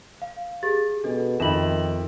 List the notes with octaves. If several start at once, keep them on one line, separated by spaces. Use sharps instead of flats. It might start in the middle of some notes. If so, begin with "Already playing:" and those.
F5
G4 G#4 A6
B2 D4 A4
F2 D#3 F4 E5 G#5 E7 F#7